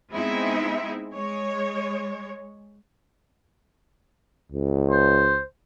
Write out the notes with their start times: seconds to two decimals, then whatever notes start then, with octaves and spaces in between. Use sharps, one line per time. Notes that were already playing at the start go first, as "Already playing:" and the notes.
0.12 G#3 B3 C4 D#4 E4 E5
1.13 G#3 C#5
4.52 C#2
4.90 C5